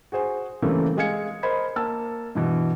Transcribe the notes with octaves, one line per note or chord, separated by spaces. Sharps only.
F#4 G#4 C5 G#5
C#3 E3 G3 A3 A#3 C4
G#3 G#4 F5 G#6 C#7
A#4 C5 D#5 B5 G#6
A#3 A5 E6
G2 B2 E3